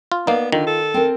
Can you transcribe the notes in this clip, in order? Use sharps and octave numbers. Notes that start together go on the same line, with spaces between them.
F4
A#3 B3 D#4 D5 F5
D3 D#3 F4
A4
C4 A#4